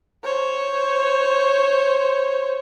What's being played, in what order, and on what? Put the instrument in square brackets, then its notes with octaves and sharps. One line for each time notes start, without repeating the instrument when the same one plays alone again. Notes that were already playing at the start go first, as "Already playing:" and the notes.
[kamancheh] C5 C#5